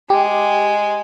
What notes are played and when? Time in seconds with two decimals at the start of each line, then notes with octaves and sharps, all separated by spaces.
0.10 G#3 G4